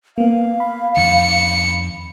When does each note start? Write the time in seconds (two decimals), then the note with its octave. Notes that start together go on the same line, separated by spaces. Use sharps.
0.18 A#3 B3 F5
0.60 B5
0.97 F2 D#3 C#7